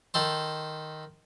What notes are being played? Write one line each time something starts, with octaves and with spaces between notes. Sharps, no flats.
D#3 A4 C5